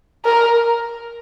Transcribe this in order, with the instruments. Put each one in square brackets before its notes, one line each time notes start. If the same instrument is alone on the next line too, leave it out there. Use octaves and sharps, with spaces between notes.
[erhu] A#4